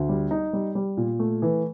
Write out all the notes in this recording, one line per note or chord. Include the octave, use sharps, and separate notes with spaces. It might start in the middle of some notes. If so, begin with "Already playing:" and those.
Already playing: D2
G3
D#4
G3
G3
A#2
A3
E3